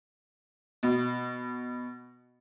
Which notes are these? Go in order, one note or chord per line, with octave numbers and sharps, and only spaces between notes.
B2